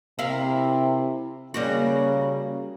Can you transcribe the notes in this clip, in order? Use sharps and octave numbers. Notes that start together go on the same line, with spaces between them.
C3 E4 A#4 F5
C#3 G3 A#3 F#4